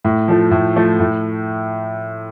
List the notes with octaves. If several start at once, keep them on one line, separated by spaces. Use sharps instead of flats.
A2
F3 A3
A2
F3 A3
A2